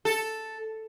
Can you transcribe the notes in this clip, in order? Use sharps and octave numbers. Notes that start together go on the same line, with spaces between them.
A4